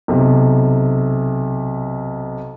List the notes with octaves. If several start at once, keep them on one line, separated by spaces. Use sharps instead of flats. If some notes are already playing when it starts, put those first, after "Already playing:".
B1 C3